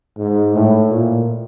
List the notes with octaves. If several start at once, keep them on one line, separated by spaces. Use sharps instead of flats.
G#2
A2
A#2